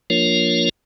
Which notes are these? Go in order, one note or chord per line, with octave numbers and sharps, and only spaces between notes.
F3 A#3 D4 F4 A#4 C#5